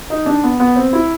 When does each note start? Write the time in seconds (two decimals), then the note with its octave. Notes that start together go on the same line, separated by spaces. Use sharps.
0.10 D#4
0.26 D4
0.44 B3
0.60 B3
0.76 C4
0.93 E4